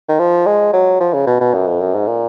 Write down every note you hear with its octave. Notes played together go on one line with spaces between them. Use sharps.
D#3
F3
G#3
F#3
F3
C#3
B2
B2
F#2
F2
F#2
G#2
A#2